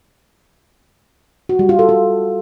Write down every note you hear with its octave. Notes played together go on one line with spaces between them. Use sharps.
F#4
G3
F4
A4
F4